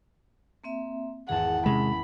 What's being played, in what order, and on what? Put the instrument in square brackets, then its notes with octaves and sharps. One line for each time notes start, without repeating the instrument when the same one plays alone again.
[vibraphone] A#3 C4 E5
[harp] G#1 E2 A5 [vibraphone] G#4 [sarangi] F#5
[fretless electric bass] C3 G#3 [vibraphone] C#4 [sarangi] B5